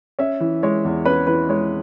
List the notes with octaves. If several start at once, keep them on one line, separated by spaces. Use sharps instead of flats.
C#4 E5
E3
G#3 C#5
E2
C#4 B4
E3 B4
G#3 C#5